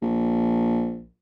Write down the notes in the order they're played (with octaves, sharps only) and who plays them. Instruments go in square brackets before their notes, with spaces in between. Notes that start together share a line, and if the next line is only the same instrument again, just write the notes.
[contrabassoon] A#1